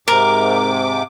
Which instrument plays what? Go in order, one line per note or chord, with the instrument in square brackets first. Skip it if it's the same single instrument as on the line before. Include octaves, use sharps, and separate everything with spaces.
[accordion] G#2 C3 D6 [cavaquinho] A#4